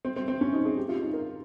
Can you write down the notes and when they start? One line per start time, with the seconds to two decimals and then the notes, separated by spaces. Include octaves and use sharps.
0.05 C4
0.16 C4
0.28 C4
0.41 C#4
0.53 D#4
0.65 G#4
0.77 G4
0.89 F4
1.02 D#4
1.13 A#4